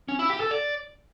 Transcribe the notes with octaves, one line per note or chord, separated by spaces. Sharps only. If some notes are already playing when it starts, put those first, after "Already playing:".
C#4
E4
G4
A4
D5